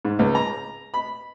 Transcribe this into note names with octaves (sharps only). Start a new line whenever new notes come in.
G#2
C#2
A#5
B5